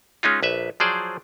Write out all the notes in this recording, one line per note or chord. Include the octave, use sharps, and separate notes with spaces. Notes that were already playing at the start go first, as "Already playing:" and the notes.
G#3 C#4 D#4 F4
A#1 B4 E5
F3 F#3 G#4 C5 D5